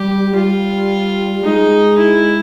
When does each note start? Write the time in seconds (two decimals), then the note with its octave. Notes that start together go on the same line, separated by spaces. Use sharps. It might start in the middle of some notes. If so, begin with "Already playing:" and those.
Already playing: G3 G4
0.35 G3 F4
1.44 G#3 D#4
1.98 E4